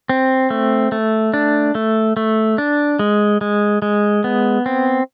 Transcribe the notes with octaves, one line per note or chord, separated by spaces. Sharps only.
C4
A3
A3
D4
A3
A3
D4
G#3
G#3
G#3
B3
C4